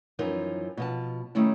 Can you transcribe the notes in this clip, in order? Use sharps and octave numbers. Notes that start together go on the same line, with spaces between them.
F#2 E3 F3 D#4 A#4
B2 F3 A5
D#3 G3 A3 C#4 E4